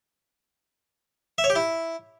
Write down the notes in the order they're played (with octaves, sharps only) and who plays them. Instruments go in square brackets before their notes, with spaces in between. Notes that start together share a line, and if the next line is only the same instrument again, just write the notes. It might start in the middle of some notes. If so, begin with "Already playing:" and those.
[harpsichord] E5
C#5
G4
E4